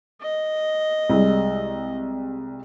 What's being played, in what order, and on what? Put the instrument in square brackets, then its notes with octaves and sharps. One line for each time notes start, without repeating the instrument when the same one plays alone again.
[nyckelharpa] D#5
[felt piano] C2 G3 G#3